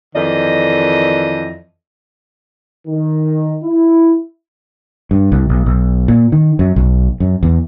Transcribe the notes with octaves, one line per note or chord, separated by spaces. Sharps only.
F2 D#3 E3 D5 D#5
D#3
E4
G2
C2
B1
B1
A#2
D#3
F#2
B1
F#2
E2